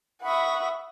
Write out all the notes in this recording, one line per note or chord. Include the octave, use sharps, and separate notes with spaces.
E5 F#5 B5 C#6 D#6